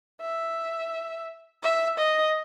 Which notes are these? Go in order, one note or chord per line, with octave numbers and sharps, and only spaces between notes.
E5
E5
D#5